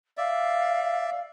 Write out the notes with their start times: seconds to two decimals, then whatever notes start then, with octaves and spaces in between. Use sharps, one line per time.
0.17 D5 E5 F5